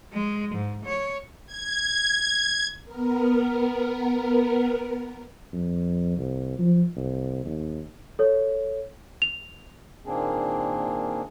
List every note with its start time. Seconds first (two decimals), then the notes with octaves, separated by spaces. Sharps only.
0.13 G#3
0.55 G#2
0.85 C#5
1.46 G#6
2.85 B3 A#4
5.53 F2
6.17 C2
6.58 F3
6.96 C2
7.46 D#2
8.19 A4 C#5
9.22 F7
10.06 A#2 D#3 A#3 C4 D4 G#4